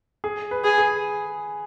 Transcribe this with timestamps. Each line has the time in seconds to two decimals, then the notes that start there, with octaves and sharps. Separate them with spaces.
0.24 G#4
0.51 B4
0.64 G#4
0.78 G#4